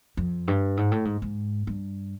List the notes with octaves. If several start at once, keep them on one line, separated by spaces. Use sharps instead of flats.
F2
G2
G#2
A2
G#2
G#2
G2